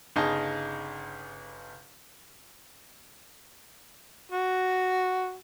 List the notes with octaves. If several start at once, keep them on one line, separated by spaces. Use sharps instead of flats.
G1 C#3 D#4 G#4 A5
F#4